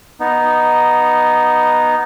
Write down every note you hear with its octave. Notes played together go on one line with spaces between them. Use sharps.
B3 D#4